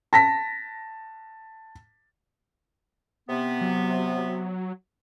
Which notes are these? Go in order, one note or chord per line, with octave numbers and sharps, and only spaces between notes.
A5 A#6 B6
C3 B3
F#3